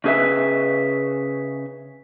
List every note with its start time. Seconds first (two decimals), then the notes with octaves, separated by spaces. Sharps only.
0.04 C#3 C#4 G#4 B4 E5